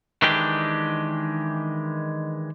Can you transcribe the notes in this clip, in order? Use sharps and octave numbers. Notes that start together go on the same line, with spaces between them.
D#3 E3 G#3 D4 G4